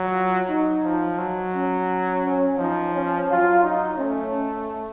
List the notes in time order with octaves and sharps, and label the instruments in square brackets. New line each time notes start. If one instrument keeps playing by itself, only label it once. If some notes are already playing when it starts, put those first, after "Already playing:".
Already playing: [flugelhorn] F#3
[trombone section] F4
[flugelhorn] F#3 [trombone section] D#4
[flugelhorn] F3
F#3
[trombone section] C#4
C#4
[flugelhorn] F3 [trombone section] D#4
[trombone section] C#4
[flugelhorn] F#3 [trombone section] F4
[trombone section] D#4
[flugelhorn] A3 [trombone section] C#4